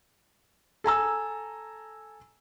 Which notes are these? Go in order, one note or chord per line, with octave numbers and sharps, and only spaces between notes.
A4 G#5 A#5 E6